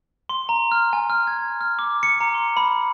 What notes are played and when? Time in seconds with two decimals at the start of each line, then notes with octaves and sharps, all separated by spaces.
0.29 C6
0.49 A#5
0.72 F6
0.93 G#5
1.10 F6
1.27 G#6
1.61 F6
1.79 D6
2.03 C#7
2.21 A#5
2.34 C6
2.57 B5